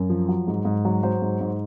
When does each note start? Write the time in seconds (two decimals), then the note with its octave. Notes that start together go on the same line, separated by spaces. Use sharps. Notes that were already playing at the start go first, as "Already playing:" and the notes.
Already playing: F#2
0.10 F3
0.29 F#3
0.47 G#2
0.65 G#2
0.85 F#3
1.03 F#3 C5
1.22 G#2
1.40 G#2